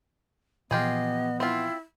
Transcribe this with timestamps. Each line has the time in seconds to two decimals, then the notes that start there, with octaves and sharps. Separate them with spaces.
0.71 A#2 E3 F3 B3 F4 G4 G#4 D#5
1.40 C4 E4 F4